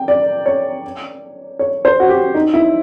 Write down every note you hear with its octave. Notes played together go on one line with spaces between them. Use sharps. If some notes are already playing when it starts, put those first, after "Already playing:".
Already playing: G5
D5
C#5
C#5
C5
F#4
G4
D#4
E4